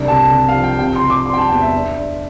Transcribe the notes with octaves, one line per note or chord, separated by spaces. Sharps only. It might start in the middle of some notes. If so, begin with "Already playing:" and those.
Already playing: C2 D4
C3 A5
C3
F5
F3
G5
C3 G5
C6
C3
D6
G3 C6
G5
A5
E2 G5
E5
D4
D4